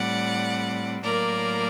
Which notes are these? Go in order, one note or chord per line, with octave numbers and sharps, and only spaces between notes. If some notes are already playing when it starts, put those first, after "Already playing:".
Already playing: A2 G3 C4 D5 F#5
A2 F#3 A#3 A#4 D5